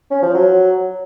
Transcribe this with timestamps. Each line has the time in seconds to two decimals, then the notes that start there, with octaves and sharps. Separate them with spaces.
0.11 C#4
0.23 F3
0.34 F#3